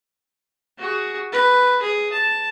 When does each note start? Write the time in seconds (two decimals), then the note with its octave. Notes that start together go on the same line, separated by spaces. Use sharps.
0.78 F#4 G#4
1.32 B4
1.82 G#4
2.13 A5